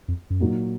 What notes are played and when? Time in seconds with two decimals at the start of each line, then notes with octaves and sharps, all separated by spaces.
0.08 F2
0.30 F#2
0.40 F2 A#2 F#3 A#3 D#4 F#4